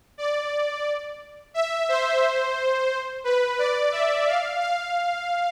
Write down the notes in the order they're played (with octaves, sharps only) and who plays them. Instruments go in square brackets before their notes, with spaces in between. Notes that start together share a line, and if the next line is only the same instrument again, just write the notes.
[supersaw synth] D5
E5
C5
B4
D5
E5
F5
F5